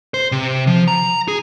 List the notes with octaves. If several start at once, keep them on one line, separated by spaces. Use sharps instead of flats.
C5
C3
F3
A#5
G#4